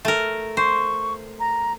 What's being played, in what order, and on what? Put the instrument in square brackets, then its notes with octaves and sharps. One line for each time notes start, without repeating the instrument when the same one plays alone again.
[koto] A3 A#4
[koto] C5 [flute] C#6
[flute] A#5